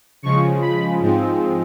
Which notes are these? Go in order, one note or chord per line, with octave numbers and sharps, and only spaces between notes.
C#3 F3 G#3 C#6
B5
G#2 F3 G#3 C4